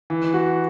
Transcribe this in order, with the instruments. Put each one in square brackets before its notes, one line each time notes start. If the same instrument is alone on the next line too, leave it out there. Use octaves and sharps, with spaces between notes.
[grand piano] E3
F#4